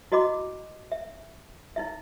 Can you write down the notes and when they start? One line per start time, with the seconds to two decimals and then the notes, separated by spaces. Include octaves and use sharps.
0.12 E4 F#4 D#5 B5 D6
0.92 E5
1.76 D#4 E4 E5